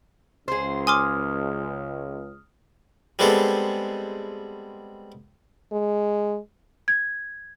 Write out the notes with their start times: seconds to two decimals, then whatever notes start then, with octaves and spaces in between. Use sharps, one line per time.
0.48 C#2 G#4 C5
0.87 G#5 C6 D6 D#6 F6
3.19 G3 G#3 B3 C4 G#4 A4
5.72 G#3
6.88 G#6